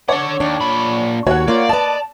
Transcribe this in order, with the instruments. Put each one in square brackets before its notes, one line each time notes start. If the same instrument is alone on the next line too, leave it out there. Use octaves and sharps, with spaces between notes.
[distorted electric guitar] D4 F#5 [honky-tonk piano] C#5 D6
[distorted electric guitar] D#2 [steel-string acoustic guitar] D4
[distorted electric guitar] A#2 B5
[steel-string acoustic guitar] D#2 F#4 [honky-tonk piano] C#5 F#5
[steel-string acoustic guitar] A#3 F4 [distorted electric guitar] D5
[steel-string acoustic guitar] B4 D#5 [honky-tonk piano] A5